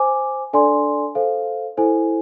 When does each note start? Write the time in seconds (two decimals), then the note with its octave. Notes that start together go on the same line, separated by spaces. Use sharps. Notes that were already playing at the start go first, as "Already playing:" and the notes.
Already playing: C5 G#5 D6
0.53 D4 A4 D5 G#5 C6
1.15 A4 C5 F5
1.77 E4 A4 C5 G#5